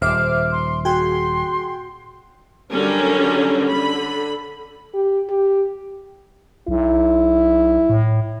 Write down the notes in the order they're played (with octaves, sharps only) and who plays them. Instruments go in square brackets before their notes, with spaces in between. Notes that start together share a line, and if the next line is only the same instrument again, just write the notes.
[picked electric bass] D#1 [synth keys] C5 E5 D6 [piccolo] F6
[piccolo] C6
[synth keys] F#4 G#4 G5 [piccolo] C6
[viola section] D3 F#3 G3 C#4 A#4
D3 B5
[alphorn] G4
G4
[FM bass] B1 [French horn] E4
[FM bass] A2